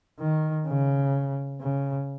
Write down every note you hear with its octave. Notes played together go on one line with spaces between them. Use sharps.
D#3
C#3
C#3